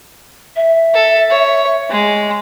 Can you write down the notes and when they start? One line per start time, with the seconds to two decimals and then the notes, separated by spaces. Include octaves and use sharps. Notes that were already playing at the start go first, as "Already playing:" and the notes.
0.56 E5
0.94 A4
1.30 C#5
1.91 G#3